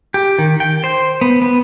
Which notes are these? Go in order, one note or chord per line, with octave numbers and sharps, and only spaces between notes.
G4
D#3
G5
C5
B3
B3